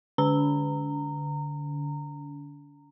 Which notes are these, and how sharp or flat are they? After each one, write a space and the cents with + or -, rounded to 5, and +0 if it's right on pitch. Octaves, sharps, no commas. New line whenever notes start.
D3 +0 D4 -45 A#5 -20